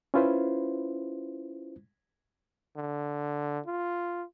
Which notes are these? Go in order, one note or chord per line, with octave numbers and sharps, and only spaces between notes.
C#4 E4 F4 B4 C5
D3
F4